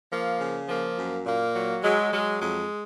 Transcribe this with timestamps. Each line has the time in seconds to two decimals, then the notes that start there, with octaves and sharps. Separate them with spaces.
0.11 F3 A#3
0.40 C#3
0.68 F3 A#3
0.97 F#2
1.25 A#2 A#3
1.55 F#3
1.83 F#3 G#3
2.12 F#3 G#3
2.40 F2 G#3